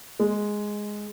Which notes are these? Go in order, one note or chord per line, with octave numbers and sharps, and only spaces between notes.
G#3